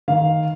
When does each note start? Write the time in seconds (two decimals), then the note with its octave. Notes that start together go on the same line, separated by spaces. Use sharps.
0.08 D#3 F5